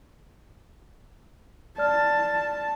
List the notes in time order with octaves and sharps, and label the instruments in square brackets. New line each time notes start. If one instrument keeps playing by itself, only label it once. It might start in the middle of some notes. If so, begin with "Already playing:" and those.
[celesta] D5 F6 [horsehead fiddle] A5